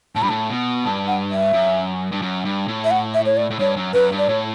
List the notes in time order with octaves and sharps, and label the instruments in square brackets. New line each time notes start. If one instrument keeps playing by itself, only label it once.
[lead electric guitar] A2 [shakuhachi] A5
[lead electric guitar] G2 [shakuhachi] B5
[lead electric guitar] A2 [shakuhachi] A5
[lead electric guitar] B2
[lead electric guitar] G2 [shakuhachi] A5
[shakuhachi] F#5
E5
[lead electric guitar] F#2
G2
F#2
G2
A2
[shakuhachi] E5
F#5
E5
C#5
D5
[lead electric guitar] A2
[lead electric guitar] G2 [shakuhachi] C#5
[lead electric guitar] F#2
[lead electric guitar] F#2 [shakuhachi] B4
[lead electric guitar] G2
[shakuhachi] D5
[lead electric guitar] A2 [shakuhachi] C#5